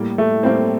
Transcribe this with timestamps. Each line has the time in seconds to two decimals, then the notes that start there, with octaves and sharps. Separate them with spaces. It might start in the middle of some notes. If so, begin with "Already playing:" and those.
Already playing: A2 G3 A#3
0.18 A3
0.43 A2 G3 A#3 C4